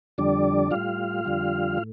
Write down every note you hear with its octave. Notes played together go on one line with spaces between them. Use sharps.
F2 D3 G3 D4 D5
A2 G3 F4 F5
F2 D3 G3
A2